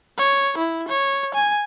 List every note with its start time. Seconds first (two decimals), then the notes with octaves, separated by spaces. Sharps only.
0.17 C#5
0.58 E4
0.88 C#5
1.34 G#5